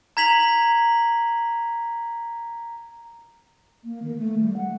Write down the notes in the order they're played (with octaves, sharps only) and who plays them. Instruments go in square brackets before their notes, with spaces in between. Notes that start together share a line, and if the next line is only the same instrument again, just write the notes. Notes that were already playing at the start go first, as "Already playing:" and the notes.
[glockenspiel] A#5 G#6 B6 F7 F#7
[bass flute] A#3
D#3
A3
G3
F#5